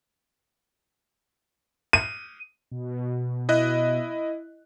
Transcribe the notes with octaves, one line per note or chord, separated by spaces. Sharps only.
D#7
B2
E4 D#5 F#6